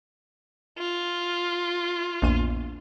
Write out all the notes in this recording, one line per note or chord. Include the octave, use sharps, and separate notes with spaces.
F4
A#1 E2 D#7